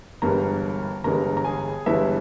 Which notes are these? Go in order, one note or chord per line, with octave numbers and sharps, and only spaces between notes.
G1 G2 E3 G#3 A#4 A#5
G1 G2 E3 G#3 A#4 A#5
A#5
G#4 G#5
G1 G2 E3 G#3 E4 E5